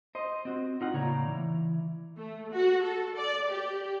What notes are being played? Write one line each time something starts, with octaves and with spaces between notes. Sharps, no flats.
C5 D#5
C4 F#4
D#4 F4 F#5
A2 C#3 A#3 C#5 D5 A#5
E3
A3
F#4
A4
D5
G4